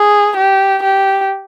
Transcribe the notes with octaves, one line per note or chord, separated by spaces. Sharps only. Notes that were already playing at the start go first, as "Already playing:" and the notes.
Already playing: G#4
G4
G4